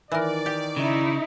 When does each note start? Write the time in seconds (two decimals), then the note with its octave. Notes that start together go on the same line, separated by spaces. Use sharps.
0.12 D#3 E3 A#4 D5
0.46 G4
0.76 C#3 D#4 E4